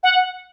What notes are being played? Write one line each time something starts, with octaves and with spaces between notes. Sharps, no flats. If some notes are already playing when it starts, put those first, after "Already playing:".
F#5